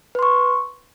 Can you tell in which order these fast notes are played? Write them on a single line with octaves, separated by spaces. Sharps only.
B4 C6 C#6